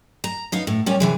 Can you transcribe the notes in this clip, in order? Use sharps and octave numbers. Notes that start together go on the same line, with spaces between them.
A#5
B3 D#4 F5
A2
A#2 G3 C#4 G4
C3 E3 G#3